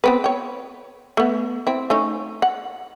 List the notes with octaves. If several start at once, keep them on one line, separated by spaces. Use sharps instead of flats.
B3 C4 B4
C#5 G5
A3 B3
C4 E4
A3 C#4 D#4
F#5